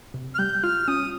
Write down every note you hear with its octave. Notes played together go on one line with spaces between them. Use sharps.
C3
F6
G3 G6
F4 F6
C#4 D#6